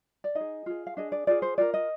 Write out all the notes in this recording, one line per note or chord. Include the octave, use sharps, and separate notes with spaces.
D5
D#4 D#5
G#4
F4 G#4
F5
D4 G#4 D#5
D5
F4 G#4 D5
C5
F4 A#4 D5
D#5